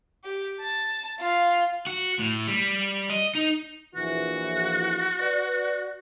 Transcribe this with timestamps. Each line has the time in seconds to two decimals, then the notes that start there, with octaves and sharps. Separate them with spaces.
0.24 G4
0.61 A5
1.20 F4
1.87 F#4
2.19 A2
2.47 G3
3.10 D#5
3.35 D#4
3.95 A#1 E3 F#4
5.20 B4 D5